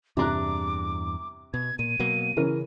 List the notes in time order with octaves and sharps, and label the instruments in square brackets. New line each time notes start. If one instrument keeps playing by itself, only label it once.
[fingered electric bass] E2 G2 D4 [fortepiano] C3 A#5 F#6 [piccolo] D6
[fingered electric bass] B2 [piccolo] G#6
[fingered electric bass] A#2 [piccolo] D#7
[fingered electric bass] B2 F#3 A#3
[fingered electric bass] C#3 [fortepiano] E3 C#4 A#4